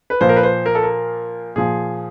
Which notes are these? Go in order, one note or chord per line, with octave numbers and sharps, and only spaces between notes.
B4
A#2 F3 C5
A#4
B4
C5
A#4
A4
A#4
A#2 F3 G#4